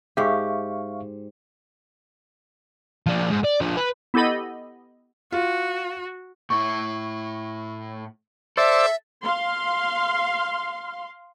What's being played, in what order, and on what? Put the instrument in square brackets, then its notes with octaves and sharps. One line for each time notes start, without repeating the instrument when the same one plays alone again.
[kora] G#2 G4 [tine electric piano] E5 F5 C#6
[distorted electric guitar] F3 D4
G#2
D5
F3 D4
B4
[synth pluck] B3 E4 G4 A4 D#5 B5
[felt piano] F4 [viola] F#4
[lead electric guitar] A2 E4 [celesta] C#6
[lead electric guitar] A4 [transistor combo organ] C5 D5 E6 [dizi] E5 [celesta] A6
[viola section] F5 C6